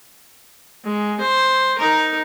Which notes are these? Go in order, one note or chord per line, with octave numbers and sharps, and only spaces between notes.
G#3
C5
D#4 A#4